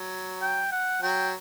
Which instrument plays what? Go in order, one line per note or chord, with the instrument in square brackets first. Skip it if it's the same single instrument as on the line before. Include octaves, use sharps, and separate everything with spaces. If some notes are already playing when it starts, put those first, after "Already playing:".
Already playing: [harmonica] F#3
[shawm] G5
F#5
[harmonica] F#3 [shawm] G5